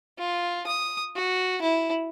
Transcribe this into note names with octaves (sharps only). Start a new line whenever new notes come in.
F4
D#6
F#4
E4